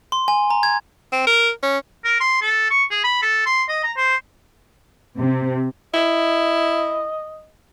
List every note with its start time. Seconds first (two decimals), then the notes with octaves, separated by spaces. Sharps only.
0.12 C6
0.28 G#5
0.50 A#5
0.63 G#6
1.13 C4
1.27 A#4
1.63 C#4
2.04 A#4
2.21 C6
2.41 A4
2.70 C#6
2.91 G#4
3.04 B5
3.22 A4
3.46 C6
3.69 D#5
3.84 A#5
3.97 C5
5.18 C3
5.94 E4 D#5